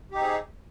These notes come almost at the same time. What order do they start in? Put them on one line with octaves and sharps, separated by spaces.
G4 D#4 C4 G#4